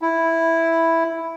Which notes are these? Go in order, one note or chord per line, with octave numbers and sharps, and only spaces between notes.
E4